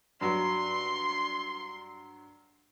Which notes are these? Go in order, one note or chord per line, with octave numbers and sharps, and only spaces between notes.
G2 F#3 C6